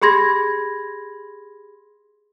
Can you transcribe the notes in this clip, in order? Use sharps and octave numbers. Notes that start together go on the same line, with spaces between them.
G4 G#4 B5 C6 G#6 A#6